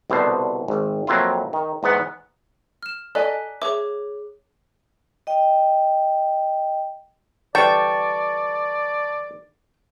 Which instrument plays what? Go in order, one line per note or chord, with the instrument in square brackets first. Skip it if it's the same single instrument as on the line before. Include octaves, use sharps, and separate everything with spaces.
[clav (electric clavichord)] C2 B2 D3 C5
G#1
F2 F#3 A#3 C4 E4 F4
D#3
E2 G#2 B3 F#5
[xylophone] F6 E7
[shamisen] A4 [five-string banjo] D5 D#5 G#5 [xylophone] A#5 F#6 B6
[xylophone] G#4 D6 [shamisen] C#5 E5
[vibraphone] D#5 G5
[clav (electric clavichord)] D3 E3 G3 [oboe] D5 [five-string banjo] G5 [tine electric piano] A5 C#6